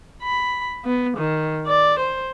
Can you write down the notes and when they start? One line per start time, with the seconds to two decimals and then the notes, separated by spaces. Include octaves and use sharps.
0.23 B5
0.85 B3
1.18 D#3
1.67 D5
1.99 C5